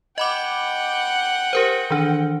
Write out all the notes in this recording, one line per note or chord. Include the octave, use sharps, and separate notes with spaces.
D#5 F#5 G5 B5 D6
G4 A#4 C5
D#3 E3 D4